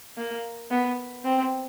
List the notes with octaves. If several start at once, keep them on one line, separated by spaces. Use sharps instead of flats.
A#3
B3
C4